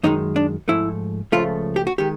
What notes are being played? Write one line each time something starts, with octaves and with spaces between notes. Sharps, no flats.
F#2 D#3 G#3 D#4
D4
G#2 F3 A3 E4
C#2 C#3 F3 A3 F4
G4
F#4
D#3 G#3 G4